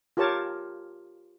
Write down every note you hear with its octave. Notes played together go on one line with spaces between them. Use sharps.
F4 G4 A#4 C#5 A5